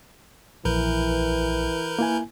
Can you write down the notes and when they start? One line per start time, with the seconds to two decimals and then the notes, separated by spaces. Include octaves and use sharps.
0.65 A#1 E3 A#4 B4 G6
1.99 A#3 E4 G#5